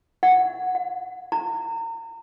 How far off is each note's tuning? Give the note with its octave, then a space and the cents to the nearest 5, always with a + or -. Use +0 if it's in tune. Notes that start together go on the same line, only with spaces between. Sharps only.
F#5 -10
F5 +45
A#5 -35